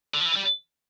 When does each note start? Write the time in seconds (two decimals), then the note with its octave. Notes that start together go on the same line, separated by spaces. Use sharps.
0.14 D3
0.20 F3
0.25 E3
0.36 G3